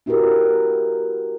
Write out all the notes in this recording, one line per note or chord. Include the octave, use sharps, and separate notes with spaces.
D4 E4 F#4 G4 A#4 B4